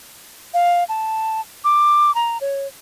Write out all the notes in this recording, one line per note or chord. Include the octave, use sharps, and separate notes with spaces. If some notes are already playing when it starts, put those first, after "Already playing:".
F5
A5
D6
A#5
C#5